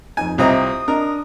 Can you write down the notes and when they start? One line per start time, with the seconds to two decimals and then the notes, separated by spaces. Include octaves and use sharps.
0.17 F2 D#4 G#5
0.38 C2 C4 F4 D#5 E5 A#5 D#6
0.88 D4 A#4 D#5